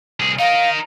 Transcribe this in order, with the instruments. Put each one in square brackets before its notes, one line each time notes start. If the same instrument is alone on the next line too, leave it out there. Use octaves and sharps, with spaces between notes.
[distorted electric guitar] C2 G#4
[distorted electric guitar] D#4 A#4 [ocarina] F5